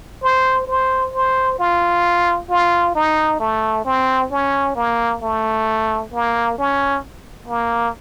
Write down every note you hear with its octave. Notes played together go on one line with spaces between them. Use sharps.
C5
C5
C5
F4
F4
D#4
A3
C4
C#4
A#3
A3
A#3
C#4
A#3